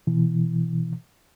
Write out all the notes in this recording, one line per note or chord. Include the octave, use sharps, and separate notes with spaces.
B2 E3